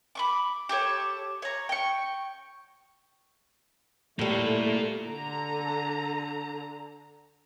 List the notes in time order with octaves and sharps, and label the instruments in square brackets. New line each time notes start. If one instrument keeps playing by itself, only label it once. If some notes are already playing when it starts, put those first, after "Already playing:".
[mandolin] B5 C#6 D6
G4 A4 C#5
C#5 A#5
G5 C#6
[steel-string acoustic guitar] A2 G3 [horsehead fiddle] A3 [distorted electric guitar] A#3 F4
[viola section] D3 A#5